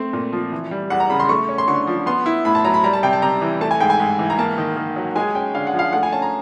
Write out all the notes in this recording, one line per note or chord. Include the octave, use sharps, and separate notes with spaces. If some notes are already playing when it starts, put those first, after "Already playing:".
Already playing: A3 C4
A#2
F3
E3
G3
E2 F#5
A#5
C#3 B5
C6
A3 C#6
C#4
C6
D3 C#6
F3
B3 C6
E4
A2 B5
A5
F#3 A#5
B5
G3 A#5
A5
C3 G5
A5
C3 A#5
E3
A3 A5
G#5
G#2 G5
G#5
G#2
E3
A#5
A#3 A5
D#3
D#3
F#3
G#3 G#5
C#4 G5
D3 F5
F#5
F3
F5
A3 F#5
G#5
C#4 A5
A#5